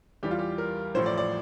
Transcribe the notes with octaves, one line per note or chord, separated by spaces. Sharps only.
E2 E3 G3 G4
F4
G4
A#4
A1 A2 F3 C5
D5
D5